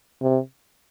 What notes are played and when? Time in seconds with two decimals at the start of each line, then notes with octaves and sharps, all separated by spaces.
0.22 C3